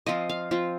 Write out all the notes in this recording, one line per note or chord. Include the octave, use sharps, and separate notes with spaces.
F3 C4 F4 D#5
F5
F3 C4 F4